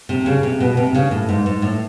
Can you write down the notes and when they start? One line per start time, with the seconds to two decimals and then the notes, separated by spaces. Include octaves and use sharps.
0.09 C3
0.26 C#3
0.43 C3
0.60 B2
0.77 C3
0.94 C#3
1.11 A2
1.29 G#2
1.46 G#2
1.62 A2